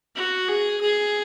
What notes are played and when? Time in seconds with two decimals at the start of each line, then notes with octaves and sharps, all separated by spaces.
0.16 F#4
0.48 G#4
0.81 G#4